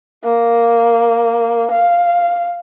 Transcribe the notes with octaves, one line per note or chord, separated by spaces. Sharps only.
A#3
F5